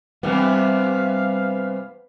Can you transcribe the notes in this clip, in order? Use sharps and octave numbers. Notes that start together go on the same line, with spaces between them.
G2 C3 E3 G3 B3 C4 F5